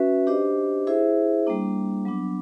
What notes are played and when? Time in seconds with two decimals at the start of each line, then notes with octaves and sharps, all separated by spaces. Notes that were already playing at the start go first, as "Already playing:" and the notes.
Already playing: C#4 F#4 B4 E5
0.27 D4 G4 C5 D#5
0.87 E4 G#4 C5 E5
1.47 G3 A#3 D4
2.05 F#3 B3 D4